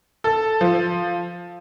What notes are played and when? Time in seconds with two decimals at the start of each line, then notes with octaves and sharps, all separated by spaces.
0.24 A4
0.61 F3